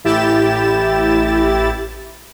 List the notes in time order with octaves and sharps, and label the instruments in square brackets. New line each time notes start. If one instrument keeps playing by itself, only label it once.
[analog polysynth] A1 E4 G4 A6 E7